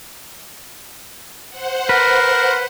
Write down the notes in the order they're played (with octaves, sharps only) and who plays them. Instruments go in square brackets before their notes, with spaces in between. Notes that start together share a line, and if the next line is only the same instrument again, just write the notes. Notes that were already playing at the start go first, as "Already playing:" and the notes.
[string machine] C5 F#5
[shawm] A#4 [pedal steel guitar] B4